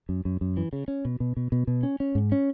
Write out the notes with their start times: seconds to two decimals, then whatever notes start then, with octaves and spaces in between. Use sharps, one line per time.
0.09 F#2
0.25 F#2
0.41 F#2
0.57 E3
0.73 C#3
0.88 C#4
1.05 B2
1.20 B2
1.37 B2
1.52 B2
1.67 B2
1.83 C#4
2.00 C#4
2.15 G#2
2.32 C#4